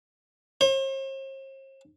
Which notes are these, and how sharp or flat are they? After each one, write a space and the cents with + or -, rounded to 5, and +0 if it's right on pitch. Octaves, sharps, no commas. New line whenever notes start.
C5 +45